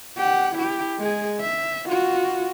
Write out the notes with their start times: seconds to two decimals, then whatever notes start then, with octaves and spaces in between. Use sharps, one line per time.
0.17 G4 F#5
0.56 E4 G4
0.98 G#3 G#4
1.41 E5
1.87 F4 F#4